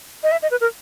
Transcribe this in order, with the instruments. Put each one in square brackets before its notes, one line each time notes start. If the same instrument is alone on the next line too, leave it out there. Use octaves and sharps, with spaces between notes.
[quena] D#5
E5
D#5
B4
A#4